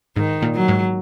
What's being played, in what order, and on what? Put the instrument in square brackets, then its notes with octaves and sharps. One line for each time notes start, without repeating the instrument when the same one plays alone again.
[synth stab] G#2 [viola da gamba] D#3
[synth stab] A#2
[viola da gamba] F#3
[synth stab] G#2